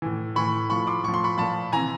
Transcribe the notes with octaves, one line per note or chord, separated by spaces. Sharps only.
A2 E3
A2 E3 B5 C#6
A2 F3 B5 C#6
C6 D6
A2 F3 C#6
C6
B5 C#6
A#2 F3 A5 B5
C3 E3 G#5 A#5